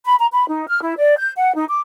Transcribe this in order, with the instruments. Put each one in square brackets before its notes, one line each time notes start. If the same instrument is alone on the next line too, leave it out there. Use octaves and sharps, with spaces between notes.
[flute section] B5
A#5
B5
D#4
F6
E4
D5
G6
F#5
D#4
D6